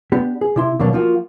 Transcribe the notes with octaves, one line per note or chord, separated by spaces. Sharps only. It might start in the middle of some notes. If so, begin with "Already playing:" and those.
B3 D4 G4
G#4
C3 E4 C6
D#2 B2 F#3 A#3 D4
F3 A#3 F4 F#4